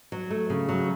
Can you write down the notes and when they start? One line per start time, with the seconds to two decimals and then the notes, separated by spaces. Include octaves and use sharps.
0.12 F#3
0.30 A3
0.50 C#3
0.69 F#3